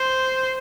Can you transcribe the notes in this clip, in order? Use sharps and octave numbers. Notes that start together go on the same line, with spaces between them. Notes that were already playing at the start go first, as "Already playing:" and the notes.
Already playing: C5